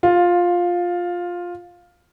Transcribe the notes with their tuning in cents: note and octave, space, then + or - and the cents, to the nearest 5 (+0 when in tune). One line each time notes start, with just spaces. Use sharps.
F4 +10 F5 +25